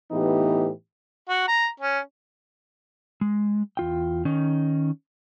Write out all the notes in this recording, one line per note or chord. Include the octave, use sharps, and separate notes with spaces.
A2 E3 B3 D#4 G4
F#4
A#5
C#4
G#3
E2 F4 G5
D#3 C#4 D#4